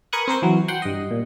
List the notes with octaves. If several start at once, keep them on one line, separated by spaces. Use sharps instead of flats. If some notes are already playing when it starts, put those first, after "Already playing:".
A#4 B4 G#5 C#6 D#6 F#6
C4 A#4 C5 C6
E3 F#3
F#5 G5 C6
G2 D#5
A#2